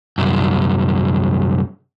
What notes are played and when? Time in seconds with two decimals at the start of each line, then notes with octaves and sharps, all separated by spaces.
0.18 C2 F#2